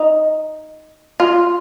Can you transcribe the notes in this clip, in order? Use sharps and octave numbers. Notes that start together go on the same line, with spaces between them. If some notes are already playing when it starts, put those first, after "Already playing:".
Already playing: D#4
F4